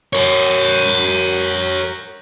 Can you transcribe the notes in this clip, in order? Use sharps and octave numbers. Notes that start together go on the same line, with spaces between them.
A#4 C#5